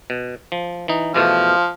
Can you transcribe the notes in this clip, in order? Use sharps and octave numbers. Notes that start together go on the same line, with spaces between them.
B2
F3
E3 D#4
E2 B2 F3 A3 F5